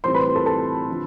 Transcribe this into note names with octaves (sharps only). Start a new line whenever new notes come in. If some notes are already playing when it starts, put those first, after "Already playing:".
A2 E3 G3 C4 C5 C6
B4 B5
A4 A5
A4 A5
D3 F3